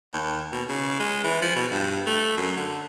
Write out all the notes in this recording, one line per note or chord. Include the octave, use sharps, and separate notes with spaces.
D#2
B2
C#3
G#3
E3
F3
B2
G2
A3
F#2
D3